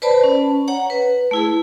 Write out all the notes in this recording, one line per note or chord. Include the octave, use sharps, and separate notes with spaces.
B4 C5 D5 A5 B5
C#4
C#5 F#5 A#5
B4
A3 E4 G#4